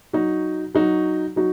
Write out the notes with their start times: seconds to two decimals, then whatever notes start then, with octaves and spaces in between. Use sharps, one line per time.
0.13 F#3 D#4 F#4
0.75 F#3 D#4 F#4
1.36 F#3 D#4 F#4